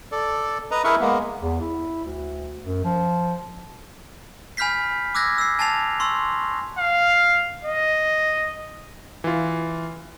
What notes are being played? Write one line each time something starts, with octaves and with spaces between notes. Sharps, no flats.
A4 D5
B4 D#5 A#5
E4 G#4 A#4 B4 E5 C#6
G#3 A#3 B3
E2
E4
D2
F#2
F3
G#5 B5 F6 G6 B6 C7
D6 E6 F#6 G#6 A#6
E6 C7
G#5 A5 A6 C7 F7
C6 C#6 E6
F5
D#5
E3 F4